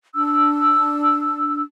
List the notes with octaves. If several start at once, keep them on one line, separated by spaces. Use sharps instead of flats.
D4 E6